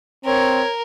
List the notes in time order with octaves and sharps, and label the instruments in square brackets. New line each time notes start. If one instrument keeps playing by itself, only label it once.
[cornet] C4 [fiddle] A#4 [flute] C#5